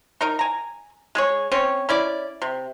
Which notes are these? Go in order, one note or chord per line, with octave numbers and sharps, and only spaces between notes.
D#4 A#4 D#5
G#5 A#5
G#3 G#4 C#5
C4 C#4 C#5
C#4 E4 D5
C3